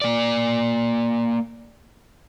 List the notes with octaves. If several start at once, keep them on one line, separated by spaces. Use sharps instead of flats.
A#3 D5